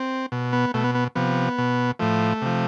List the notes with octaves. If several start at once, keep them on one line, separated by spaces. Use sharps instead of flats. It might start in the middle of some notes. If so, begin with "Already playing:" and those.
Already playing: C4
B2
B3
B2 A3
B3
B3
C3 F3 B3
B2
A2 F3 A3
C3 F3